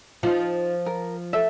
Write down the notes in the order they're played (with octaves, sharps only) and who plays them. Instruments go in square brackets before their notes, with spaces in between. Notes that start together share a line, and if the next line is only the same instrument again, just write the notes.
[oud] F3 [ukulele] D#4 F4
[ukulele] A#4
A4 E5